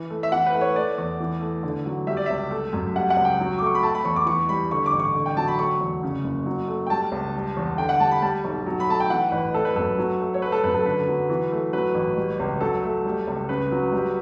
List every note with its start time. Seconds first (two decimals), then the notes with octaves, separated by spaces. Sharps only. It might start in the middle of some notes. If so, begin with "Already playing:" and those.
Already playing: E3
0.10 A3
0.23 E5
0.32 E3 F#5
0.46 B4
0.54 A3
0.61 C#5
0.76 A3 D5
0.98 E2
1.20 E3
1.41 A3
1.63 D3
1.86 F#3
2.07 G3 E5
2.17 D5
2.26 C#2 E5
2.51 A3
2.73 F#2
2.95 G3 F#5
3.10 F#5
3.17 C#2
3.25 G5
3.40 F#3
3.58 A3 D6
3.66 C#6
3.75 B5
3.83 A3 A5
3.95 B5
4.05 E2 C#6
4.16 D6
4.26 E3 C#6
4.49 G3 B5
4.71 D3 C#6
4.86 D6
4.93 A1
5.00 C#6
5.14 D3
5.26 G5
5.37 F#3 A5
5.48 B5
5.59 A3 C#6
5.81 E2
6.03 C#3
6.24 F#1
6.46 F#3
6.68 A3
6.87 G5
6.90 G3 A5
7.12 C#2
7.35 G3
7.57 E2
7.78 D3 G5
7.89 F#5
8.00 G3 A5
8.11 B5
8.22 G3 A5
8.45 B1
8.66 F#3
8.80 B5
8.88 A3 A5
9.00 G5
9.10 E3 F#5
9.32 A1 B4
9.54 A3 A4
9.65 B4
9.76 F#2 A4
9.98 F#3
10.20 A3
10.34 C#5
10.42 A3 B4
10.52 A4
10.64 F#2 B4
10.74 A4
10.85 D3 B4
11.08 F#3
11.30 E3
11.52 A3
11.73 F#3 B4
11.95 A1
12.17 G3
12.39 C#2
12.61 F#3 A4
12.84 A3
13.06 G3
13.27 C#2
13.49 C#3 B4
13.71 F#3
13.92 G3